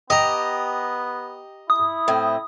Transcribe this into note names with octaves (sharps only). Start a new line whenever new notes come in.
B3 G4 D#5 A#5
E4 D#6
A2 C4